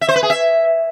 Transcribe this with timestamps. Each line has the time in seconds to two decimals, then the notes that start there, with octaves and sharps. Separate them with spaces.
0.01 E5
0.09 C5
0.16 B4
0.23 G#4
0.30 E5